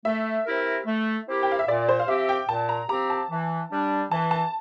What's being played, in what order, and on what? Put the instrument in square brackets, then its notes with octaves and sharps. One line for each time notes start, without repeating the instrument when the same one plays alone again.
[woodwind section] A3 [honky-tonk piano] E5
[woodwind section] C4 E4 G4 A#4
A3
C4 E4 G4 A#4
[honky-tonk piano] G5
F5
E5
[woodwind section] A#2 [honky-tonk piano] D5
[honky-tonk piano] C5
F5
[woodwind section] F3 C4 G4 [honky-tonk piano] E5
[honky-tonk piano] G5
[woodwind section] A#2 [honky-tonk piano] A5
[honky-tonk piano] A#5
[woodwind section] F3 C4 G4 [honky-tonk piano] A#5
[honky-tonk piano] A5
[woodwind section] E3
G3 D4
[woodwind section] E3 [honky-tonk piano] A5
[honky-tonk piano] A5